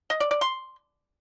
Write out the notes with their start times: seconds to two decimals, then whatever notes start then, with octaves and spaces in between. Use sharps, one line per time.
0.10 D#5
0.20 D5
0.31 D5
0.41 C6